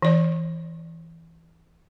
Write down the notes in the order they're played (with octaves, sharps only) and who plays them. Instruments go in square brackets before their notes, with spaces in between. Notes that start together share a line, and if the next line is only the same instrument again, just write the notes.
[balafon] E3 D5